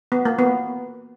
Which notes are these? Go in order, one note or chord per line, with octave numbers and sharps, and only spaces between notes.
B3
A#3
B3